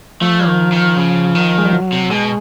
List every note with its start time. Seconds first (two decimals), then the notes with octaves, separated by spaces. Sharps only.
0.21 F3 A3
0.46 D#3
0.72 D#3
0.97 C#3
1.35 D#3
1.58 G#3
1.65 G3
1.73 F#3
1.92 C3
2.11 B2 G#3